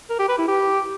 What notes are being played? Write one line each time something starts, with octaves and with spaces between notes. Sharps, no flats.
A#4
G4
B4
E4
G4